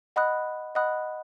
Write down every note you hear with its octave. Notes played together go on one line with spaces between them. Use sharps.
D#5 F#5 B5 D#6 F#6
D#5 F#5 B5 D#6 F#6